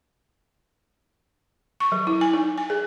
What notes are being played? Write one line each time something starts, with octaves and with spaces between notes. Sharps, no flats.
C#6
F#3
E4
G#5
D#4
G#5
G#4